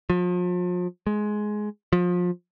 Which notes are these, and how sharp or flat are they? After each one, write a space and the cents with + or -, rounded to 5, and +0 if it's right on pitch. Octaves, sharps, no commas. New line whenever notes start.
F3 +40
G#3 +15
F3 +30